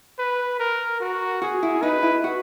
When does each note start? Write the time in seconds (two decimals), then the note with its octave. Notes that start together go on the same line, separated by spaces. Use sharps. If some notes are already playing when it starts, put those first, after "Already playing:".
0.19 B4
0.60 A#4
1.00 F#4
1.42 F#4 G#4
1.63 E4
1.82 D#4 B4
2.03 E4
2.24 F#4